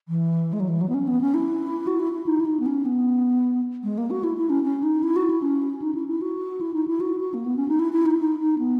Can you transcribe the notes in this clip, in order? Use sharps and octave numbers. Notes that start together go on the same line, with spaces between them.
E3
G#3
F#3
E3
F#3
B3
C#4
B3
C#4
E4
F#4
E4
E4
D#4
E4
D#4
B3
C#4
B3
G#3
A#3
F#4
E4
E4
C#4
C#4
D#4
E4
F#4
E4
C#4
D#4
E4
E4
F#4
E4
D#4
E4
F#4
F#4
A#3
B3
C#4
D#4
E4
E4
D#4
D#4
D#4
B3